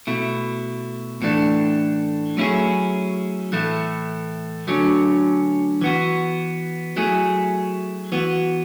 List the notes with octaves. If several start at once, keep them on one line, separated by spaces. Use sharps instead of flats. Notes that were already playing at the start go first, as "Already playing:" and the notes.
B2 A3 E4
A2 E3 A3 D4
F#3 A3 C#4 E4 G#4
A2 E3 A3 E4
D3 F#3 A3 C#4
E3 B3 F#4
F#3 A3 E4 G#4
E3 B3 F#4